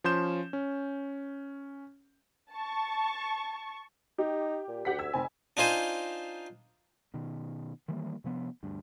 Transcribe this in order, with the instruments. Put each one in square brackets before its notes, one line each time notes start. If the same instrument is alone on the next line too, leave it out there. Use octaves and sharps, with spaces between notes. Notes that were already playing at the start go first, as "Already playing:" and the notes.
[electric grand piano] F3 C#4 C6 G6 E7
C#4
[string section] A5 C#6
[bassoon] D#4 [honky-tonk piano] G4
[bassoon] A#2
[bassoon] D2 [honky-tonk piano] G4 F#5 B6
[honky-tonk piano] E6 G#6
[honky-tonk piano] F1 G#5 [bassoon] C4
[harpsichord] D4 D#4 F4 C5 G#5
[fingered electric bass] B2 D#3
D#3 E3 G3 A#3
C3 F3 B3
D2 G2